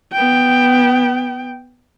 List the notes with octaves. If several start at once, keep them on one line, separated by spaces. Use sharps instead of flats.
B3 G5